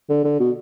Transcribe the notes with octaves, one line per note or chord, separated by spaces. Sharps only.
D3
D3
B2